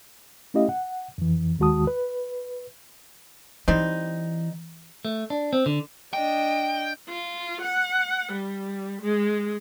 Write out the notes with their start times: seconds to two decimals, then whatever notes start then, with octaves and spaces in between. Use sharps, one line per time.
0.54 A3 C#4 E4 G4 D#5 F5
0.69 F#5
1.18 F2 E3
1.59 D#2 D#3 G#3 F#4 A5 D#6
1.87 B4
3.68 E3 G3 C4 D#4
5.05 A3
5.30 D4
5.53 C4
5.66 D3
6.13 D4 D#5 G5
7.09 F4
7.61 F#5
8.32 G3
9.01 G#3